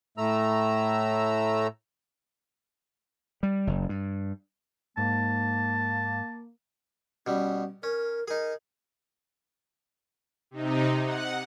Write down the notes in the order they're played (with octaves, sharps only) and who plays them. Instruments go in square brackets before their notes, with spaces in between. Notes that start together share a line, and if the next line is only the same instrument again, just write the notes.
[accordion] A2 A3 A#5 E6
[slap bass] G3
F#1
G2
[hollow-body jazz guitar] G#2 [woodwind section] A#3 [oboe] A5
[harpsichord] B2 G3 [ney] C#4
[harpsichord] C#4 [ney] A#4
[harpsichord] D#4 G#4 [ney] A#4
[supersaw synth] C3 D#4
F#5